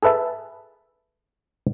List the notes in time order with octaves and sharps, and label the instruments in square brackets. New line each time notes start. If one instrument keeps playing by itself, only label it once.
[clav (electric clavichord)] G#4 A4 B4 E5 A5